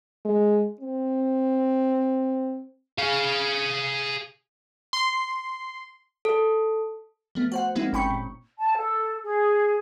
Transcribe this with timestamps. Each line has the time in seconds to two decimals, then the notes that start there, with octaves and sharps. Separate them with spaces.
0.25 G#3
0.81 C4
2.99 G#4 F5
4.93 C6
6.25 A4
7.35 F3 A3 B3
7.52 F#4 C5 F#5
7.75 F3 G#3 A#3 C4 D#4 E4
7.93 G1 C#4 G5 B5 C#6 C#7
8.10 A#2
8.59 A5
8.76 A4
9.23 G#4